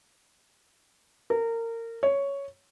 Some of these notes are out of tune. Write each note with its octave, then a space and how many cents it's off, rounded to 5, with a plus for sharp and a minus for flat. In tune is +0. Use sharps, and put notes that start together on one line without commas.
A#4 -25
C#5 +5